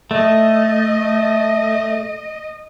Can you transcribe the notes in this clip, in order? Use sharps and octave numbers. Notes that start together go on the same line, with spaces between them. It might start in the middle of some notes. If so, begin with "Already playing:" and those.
A3 D#5